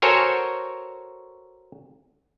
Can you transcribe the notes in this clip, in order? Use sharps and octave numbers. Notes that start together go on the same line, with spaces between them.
F#4 A4 A#4 C5 C#5 G#5